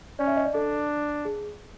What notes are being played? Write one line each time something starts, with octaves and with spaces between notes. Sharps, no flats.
C#4 D5
E5
D#5
D5
D4 A4
G#4